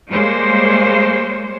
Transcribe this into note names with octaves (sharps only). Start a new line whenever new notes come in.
G3 G#3 A#3 C5 C#5